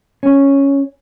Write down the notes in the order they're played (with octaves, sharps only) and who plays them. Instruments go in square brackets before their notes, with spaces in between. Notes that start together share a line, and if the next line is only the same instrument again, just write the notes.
[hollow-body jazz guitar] C#4